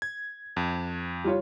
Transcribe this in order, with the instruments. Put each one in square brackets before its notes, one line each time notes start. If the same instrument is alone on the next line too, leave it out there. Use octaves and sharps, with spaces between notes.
[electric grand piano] G#6
F2
[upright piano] G3 F4 C#5